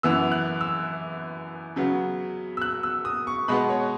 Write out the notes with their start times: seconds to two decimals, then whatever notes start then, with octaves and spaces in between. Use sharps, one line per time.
0.03 F#2 E3 B3 E6
0.32 F#6
0.61 E6
1.76 C#3 F#3 B3
2.57 E6
2.62 F#6
2.83 E6
3.05 D#6
3.27 C#6
3.48 B2 G#3 B3 B5
3.70 C#5